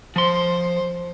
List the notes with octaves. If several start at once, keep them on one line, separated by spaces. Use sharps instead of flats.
F3 C5 C6